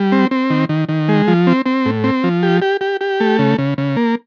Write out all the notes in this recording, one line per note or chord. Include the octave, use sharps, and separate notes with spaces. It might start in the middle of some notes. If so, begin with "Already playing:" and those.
Already playing: G3
C4
C4
D#3
D#3
D#3
G#3
F3
C4
C4
A2
C4
F3
G4
G4
G4
G4
A3
C#3
C#3
C#3
A#3